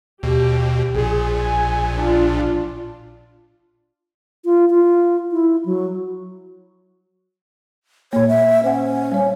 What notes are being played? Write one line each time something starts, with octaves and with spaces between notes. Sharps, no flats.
D#2 B2 G4
A#1 A#2 G#4
G#5
D4 F4
F4
F4
E4
F#3
A#2 A#3 C#5
E5
C#4 C5 F#5
G3 C#5